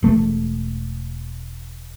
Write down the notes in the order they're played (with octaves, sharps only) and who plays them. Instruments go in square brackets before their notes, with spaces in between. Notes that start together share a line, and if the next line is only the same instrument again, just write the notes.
[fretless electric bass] E1 A3